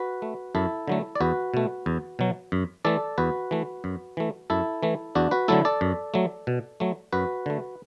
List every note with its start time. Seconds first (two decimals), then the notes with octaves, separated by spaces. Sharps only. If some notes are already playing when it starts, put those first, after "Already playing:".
Already playing: F#4 B4
0.22 A3
0.55 F#2 E4 A4
0.88 D3 F#3 A3
1.15 D5
1.21 E2 F#4 B4
1.54 B2 A3
1.86 E2
2.19 B2 F#3
2.52 F#2
2.85 E3 A3 A4 D5
3.18 E2 F#4 B4
3.51 E3 A3
3.84 F#2
4.17 E3 A3
4.50 F#2 E4 A4
4.83 E3 A3
5.15 E2 D4 F#4
5.31 F#4 B4
5.48 D3 F#3 A3 E4 A4
5.65 A4 D5
5.81 F#2
6.14 F#3 A3
6.47 B2
6.80 F#3 A3
7.13 F#2 F#4 B4
7.46 D3 A3